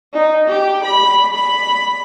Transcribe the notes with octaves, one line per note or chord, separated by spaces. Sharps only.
D#4
G4
B5
B5